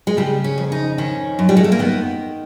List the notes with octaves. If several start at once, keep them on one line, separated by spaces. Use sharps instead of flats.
G#3
C#3 G3
C#4
F2
D#4
D#3 C#4
F#2
G3
G#3
A3
A#3
D#3 B3